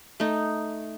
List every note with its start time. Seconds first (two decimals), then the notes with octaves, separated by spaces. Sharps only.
0.20 A3 D#4